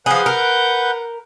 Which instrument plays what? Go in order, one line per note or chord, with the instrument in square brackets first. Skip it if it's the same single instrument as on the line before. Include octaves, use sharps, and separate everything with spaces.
[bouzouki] F3 G#4 [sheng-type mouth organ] B4 F#5 G6
[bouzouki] A#4